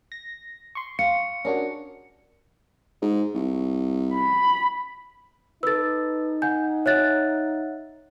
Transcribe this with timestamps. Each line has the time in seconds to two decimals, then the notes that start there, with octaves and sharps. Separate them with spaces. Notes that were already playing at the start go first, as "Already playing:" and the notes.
0.12 A#6
0.75 C6 C#6
0.99 F5 C#7
1.45 C#4 D4 F#4 G#4 A#4
3.02 G#2
3.35 C2
4.14 B5
5.63 D#4 A4 B4 E6 A6
6.42 F#5 G#5 G6
6.86 C#5 E5 F#5 F#6 A6